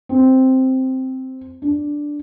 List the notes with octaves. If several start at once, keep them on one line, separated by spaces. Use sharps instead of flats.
C4
D4